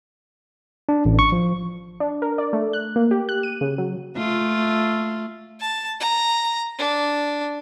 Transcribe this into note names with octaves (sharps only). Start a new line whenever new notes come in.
D4
A1
C#6
F3
D4
A#4
D5
A3
F#6
A#3
G4
F#6
D#7
C#3
F#3
A3 F4
A5
A#5
D4